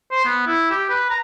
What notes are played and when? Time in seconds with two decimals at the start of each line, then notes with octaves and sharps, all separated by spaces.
0.12 C5
0.25 B3
0.47 E4
0.71 G4
0.90 B4
1.10 A#5